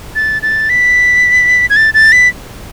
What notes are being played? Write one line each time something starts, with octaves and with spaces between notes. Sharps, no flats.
A6
A6
B6
G#6
A6
A6
B6